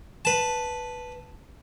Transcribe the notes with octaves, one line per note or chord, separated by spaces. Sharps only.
B4 A5